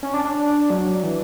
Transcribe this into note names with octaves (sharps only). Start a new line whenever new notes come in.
C#4
D4
D4
F#3
E3